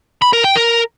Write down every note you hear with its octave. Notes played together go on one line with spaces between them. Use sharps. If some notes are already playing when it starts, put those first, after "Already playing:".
B5
A#4
G5
A#4